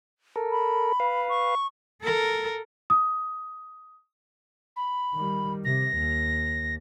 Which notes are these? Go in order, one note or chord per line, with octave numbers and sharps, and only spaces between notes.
A4 A#4
B5
B4 F5
C#6
A4 A#4
D#6
B5
D#3 G3
C3 A#6
D#2